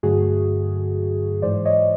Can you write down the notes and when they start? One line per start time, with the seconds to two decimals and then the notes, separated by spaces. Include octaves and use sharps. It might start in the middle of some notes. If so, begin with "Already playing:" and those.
0.03 G2 D3 F#3 A3 F#4 G#4
1.42 G#2 E3 G#3 C5 D5
1.65 C#5 D#5